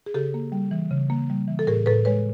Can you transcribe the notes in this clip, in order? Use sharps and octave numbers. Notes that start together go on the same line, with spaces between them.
G#4
C#3 G4 A4
A#3
G3
E3
C#3
A#3
G3
E3
A4
A2 G#4 A#4
A2 A4 B4
G#3 B4 C#5